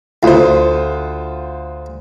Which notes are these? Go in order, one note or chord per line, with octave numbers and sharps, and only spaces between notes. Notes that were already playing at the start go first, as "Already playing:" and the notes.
D2 F4 C5